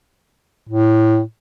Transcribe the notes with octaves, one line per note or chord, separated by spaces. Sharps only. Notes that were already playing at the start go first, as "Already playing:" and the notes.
A2